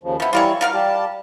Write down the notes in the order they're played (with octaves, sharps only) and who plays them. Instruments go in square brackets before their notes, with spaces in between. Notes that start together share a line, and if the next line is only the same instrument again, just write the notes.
[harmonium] D#2 C#3 F3
[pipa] F3 B3 [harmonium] E4
[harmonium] E3 G3 E4 [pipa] F4 A#4 C#5
[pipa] F4 A#4 F5 [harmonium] F#5
[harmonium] G3 G4 A5